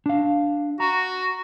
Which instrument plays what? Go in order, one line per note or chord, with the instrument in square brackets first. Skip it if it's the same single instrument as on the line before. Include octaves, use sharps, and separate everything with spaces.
[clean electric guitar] D4 F5
[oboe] F#4 [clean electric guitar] A#5